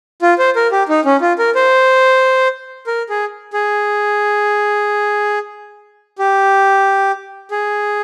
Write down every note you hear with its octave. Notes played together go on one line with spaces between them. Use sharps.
F4
C5
A#4
G4
D#4
C#4
F4
A#4
C5
A#4
G#4
G#4
G4
G#4